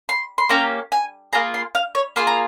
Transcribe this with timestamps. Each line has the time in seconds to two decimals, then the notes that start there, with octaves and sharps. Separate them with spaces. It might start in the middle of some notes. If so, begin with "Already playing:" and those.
0.09 C6
0.38 C6
0.49 A#3 C#4 G4 A#5
0.92 G#5
1.33 A#3 F4 G#4 A#5
1.54 C6
1.75 F5
1.95 C#5
2.16 A#3 F4 G#4 C6
2.27 A#5